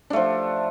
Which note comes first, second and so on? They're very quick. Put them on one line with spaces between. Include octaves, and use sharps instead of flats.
D4 A3 F3